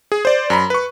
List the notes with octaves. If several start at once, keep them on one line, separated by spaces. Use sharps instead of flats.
G#4
C5 D5
F#2 A#5 B5
B4 C#6